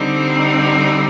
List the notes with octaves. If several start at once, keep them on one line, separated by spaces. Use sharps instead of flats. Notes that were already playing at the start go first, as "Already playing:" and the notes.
Already playing: D3 G3 C4 D#4